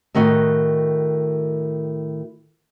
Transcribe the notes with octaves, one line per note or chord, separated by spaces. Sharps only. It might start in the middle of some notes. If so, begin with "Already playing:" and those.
A2 D#3 F#4 D#5